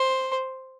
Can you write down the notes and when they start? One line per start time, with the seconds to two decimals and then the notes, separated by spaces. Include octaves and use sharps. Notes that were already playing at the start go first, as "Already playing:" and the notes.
Already playing: C5